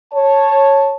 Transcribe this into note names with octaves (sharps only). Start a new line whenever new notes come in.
C#5 A5